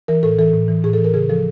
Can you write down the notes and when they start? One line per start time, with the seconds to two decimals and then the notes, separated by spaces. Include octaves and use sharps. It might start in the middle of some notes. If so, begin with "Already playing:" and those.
0.08 E3 A#4
0.23 A2 A4
0.39 E3 A4
0.54 A2
0.68 E3
0.84 A2 G#4
0.93 A4
0.99 E3
1.04 A#4
1.14 C#3 G#4
1.29 F3 A4